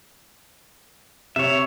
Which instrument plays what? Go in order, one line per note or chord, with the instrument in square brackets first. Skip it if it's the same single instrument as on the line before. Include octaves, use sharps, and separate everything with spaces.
[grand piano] C3 [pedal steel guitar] C#5 E5